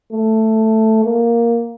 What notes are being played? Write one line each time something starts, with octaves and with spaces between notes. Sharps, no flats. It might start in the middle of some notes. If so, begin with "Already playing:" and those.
A3
A#3